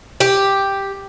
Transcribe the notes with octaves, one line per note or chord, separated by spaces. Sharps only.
G4